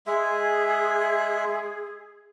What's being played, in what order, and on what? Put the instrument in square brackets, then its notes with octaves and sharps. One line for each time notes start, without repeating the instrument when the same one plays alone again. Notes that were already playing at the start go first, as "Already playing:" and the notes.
[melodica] G#3 E5 [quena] G#4